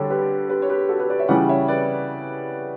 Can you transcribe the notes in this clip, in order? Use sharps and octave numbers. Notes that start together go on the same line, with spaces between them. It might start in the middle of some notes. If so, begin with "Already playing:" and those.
Already playing: D3 G3 D4 A4 C#5 D5
G4 B4
G4 B4
C#5
G4 B4
F#4 A4
G4 B4
B4 D5
C#5 E5
C#3 E3 G3 D5 F#5
C#5 E5
B4 D5